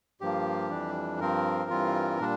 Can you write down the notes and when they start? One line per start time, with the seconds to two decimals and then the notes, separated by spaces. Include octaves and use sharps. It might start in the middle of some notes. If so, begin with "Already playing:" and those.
0.21 G2 F3 A#3 G4
0.70 F2 E3 G3 D4
1.20 G2 F3 C4 A#4
1.70 G2 E3 G3 C4 F4
2.19 A#2 G3 D4